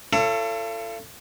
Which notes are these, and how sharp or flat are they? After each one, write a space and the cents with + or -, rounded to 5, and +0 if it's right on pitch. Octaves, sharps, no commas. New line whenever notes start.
F4 -45 A4 +20 C#5 +0